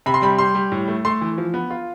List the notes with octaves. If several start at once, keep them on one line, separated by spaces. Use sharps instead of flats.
C3 B5
C6
G3 B5
G3 C6
G3
A2
A3
A3 C6
E3
F3
B3
F4